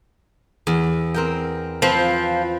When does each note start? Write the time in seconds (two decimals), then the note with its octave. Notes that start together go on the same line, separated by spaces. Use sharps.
0.67 E2
1.14 C4 A#4 G5
1.82 F3 C4 B4 C5